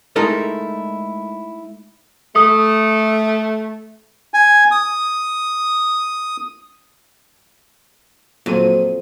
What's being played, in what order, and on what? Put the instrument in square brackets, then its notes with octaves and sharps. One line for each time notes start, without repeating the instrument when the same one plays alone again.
[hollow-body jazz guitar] G#3 A3 D#4 E4 A4 A#4
[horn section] A3 [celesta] D#6
[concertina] G#5
D#6
[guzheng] F2 [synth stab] A#2 F#3 D#7